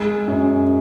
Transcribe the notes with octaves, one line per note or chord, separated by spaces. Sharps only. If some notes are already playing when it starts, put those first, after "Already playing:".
Already playing: G#3
F#2